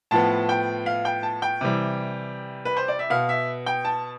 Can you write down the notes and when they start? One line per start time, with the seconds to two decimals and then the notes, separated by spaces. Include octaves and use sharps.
0.11 A2 F3 B3 A5
0.49 G5
0.86 F5
1.05 G5
1.23 A5
1.42 G5
1.61 C3 E3 G3
2.65 B4
2.77 C5
2.88 D5
2.99 E5
3.10 B2 B3 F5
3.29 E5
3.66 G5
3.85 A5